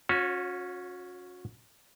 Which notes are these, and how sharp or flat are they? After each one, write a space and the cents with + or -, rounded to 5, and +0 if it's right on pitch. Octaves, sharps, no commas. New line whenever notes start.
C#4 +0 F#4 -40 C#5 -40